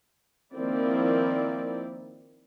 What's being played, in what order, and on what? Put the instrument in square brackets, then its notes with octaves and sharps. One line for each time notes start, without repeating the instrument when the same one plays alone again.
[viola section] D#3 F3 A#3 C4 E4 D5